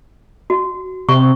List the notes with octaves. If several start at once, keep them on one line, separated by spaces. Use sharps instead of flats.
F#4
C3 C#6